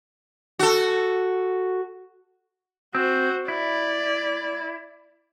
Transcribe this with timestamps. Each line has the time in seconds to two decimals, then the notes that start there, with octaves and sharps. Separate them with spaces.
0.59 F#4 A4
2.95 C4 F#4 C5
3.48 E4 D5